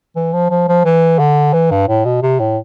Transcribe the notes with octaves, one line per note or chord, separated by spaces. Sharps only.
E3
F3
F3
F3
E3
D3
E3
G2
A2
B2
C3
A2